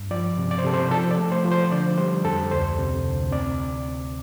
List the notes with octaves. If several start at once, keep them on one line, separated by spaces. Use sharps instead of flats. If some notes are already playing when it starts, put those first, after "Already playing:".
Already playing: G2
F3 D5
C3
D5
C5
C3 A4
C5
F3 A4
D5
A3
C5
F3
C5
D3 D5
G3 C5
F2 A4
D2 C5
C3
D2
C4 D5